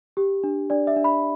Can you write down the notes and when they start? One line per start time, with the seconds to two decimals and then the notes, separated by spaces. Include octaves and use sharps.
0.17 G4
0.44 D4
0.70 D4 D5
0.87 E5
0.96 D4
1.04 B5